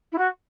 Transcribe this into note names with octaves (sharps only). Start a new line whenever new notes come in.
E4
F#4